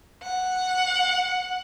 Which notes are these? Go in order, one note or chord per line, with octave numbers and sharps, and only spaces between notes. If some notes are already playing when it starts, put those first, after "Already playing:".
F#5